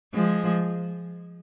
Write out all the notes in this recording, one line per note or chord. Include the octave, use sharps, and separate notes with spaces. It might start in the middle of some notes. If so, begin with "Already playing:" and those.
F3 G#3